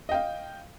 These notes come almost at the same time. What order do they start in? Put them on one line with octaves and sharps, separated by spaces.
D#5 G5 F5